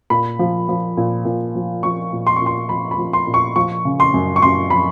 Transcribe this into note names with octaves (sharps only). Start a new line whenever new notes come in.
A#2 B5
F3
F3
A#2
A#2
F3
F3 C#6
A#2
C6
A#2 C#6
C6
F3 B5
B5
F3
C6
A#2
C#6
F3 C#6
C#3
C6
F#2
C#6
F#2 C6
F3 B5